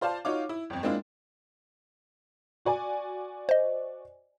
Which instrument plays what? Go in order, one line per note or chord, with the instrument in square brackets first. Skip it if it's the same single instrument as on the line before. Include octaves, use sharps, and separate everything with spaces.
[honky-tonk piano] F4 C5 D5 F5 A5
D#4 F4 F#4 C#5 F5 D6
E4
G1 F2
G#3 A#3 C4 D4 E4 F4
F#4 D5 G#5
[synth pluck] C5 D#5